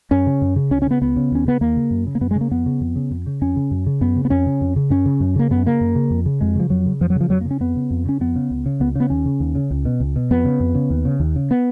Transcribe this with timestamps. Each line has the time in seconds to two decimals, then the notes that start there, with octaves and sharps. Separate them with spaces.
0.11 F#2 C#4
0.27 C#3
0.42 F#2
0.56 C#3
0.71 C#2 C#4
0.82 C#4
0.86 C#3 B3
1.02 C#2 B3
1.16 C#3
1.31 D#2 C#4
1.46 C#3 B3
1.61 D#2 A#3
1.76 C#3
1.91 F#2
2.07 C#3
2.15 A#3
2.21 F#2 B3
2.31 G#3
2.36 C#3
2.41 A#3
2.51 F2 B3
2.66 C#3
2.81 F2
2.96 C#3
3.11 F2
3.26 C#3
3.41 F2 C#4
3.56 C#3
3.71 F#2
3.86 C#3
4.01 F#2 B3
4.16 C#3
4.25 B3
4.30 F2 C#4
4.46 C#3
4.61 F2
4.76 C#3
4.90 F#2 C#4
5.06 C#3
5.20 F#2
5.36 C#3 A#3
5.50 F#2 B3
5.66 C#3 A#3
5.81 F#2
5.95 C#3
6.11 F2
6.26 C#3
6.41 F2 G#3
6.55 C#3 F3
6.70 F2 F#3
6.86 C#3
7.01 F2 F3
7.10 F#3
7.16 C#3 F3
7.30 F2 F#3
7.41 A#3
7.45 C#3
7.51 C#4
7.60 F2 B3
7.76 C#3
7.91 F2
8.06 C#3 C#4
8.20 F2 B3
8.36 C#3
8.50 C#2
8.66 C#3
8.80 C#2 B3
8.95 C#3 B3
9.10 D#2 C#4
9.26 C#3
9.40 D#2
9.55 C#3
9.71 C#2
9.85 B2
10.00 C#2
10.16 B2
10.31 F2 B3
10.45 C#3
10.60 F2
10.75 C#3
10.90 D#2
11.05 C#3
11.20 D#2
11.36 C#3
11.51 B3